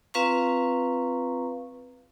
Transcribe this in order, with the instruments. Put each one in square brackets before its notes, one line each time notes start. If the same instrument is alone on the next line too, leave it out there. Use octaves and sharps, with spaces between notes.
[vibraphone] C4 F4 B4 F5 A#5 C#6